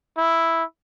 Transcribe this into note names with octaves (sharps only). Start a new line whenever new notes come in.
E4